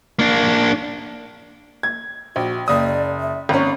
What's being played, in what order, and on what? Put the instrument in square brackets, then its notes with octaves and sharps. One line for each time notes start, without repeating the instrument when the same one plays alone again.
[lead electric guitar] A#3 D4
[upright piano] G#6
[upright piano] A#1 [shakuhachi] F#4
[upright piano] F#1 D#6 [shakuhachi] D5
[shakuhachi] E5
[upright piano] G#1 C#4 [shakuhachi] A#5